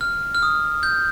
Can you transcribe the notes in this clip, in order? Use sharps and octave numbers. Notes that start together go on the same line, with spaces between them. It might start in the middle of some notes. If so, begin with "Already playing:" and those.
F6
F6
D#6
G6